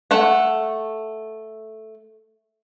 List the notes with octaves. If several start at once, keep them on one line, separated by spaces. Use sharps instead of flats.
A3 A4 F#5